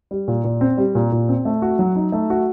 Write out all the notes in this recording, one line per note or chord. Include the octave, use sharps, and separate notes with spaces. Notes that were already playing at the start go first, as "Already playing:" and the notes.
G3
A#2
A#2
C4
G3
A#2
A#2
C4
A3
F#4
F#3
D#4
A3
F#4